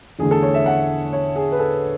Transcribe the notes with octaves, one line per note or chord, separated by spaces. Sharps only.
E2 D3 A3 G#4
A4
C#5
E5
F#5
C#5
G#4
B4
A4